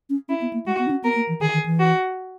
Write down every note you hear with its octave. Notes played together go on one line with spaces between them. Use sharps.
C#4
C#4 E4
B3
A#3
G#3 F#4
B3
D#4
C#4
B3 A#4
A#3
E3
D#3 G#4
D#3
E3
F#4